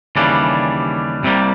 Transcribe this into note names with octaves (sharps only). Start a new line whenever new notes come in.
D#2 C#3 E3 G3 D4
C2 C3 E3 G3 A#3